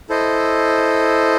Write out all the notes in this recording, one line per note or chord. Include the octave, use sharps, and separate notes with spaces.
E4 A4 C5 D#5